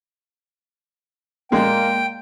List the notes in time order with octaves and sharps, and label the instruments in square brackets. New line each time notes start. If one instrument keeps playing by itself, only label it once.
[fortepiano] A#2 G#3 [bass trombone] A#3 [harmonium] G5